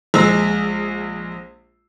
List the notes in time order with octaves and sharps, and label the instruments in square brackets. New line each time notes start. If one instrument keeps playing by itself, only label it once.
[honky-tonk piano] A#1 G#3 E6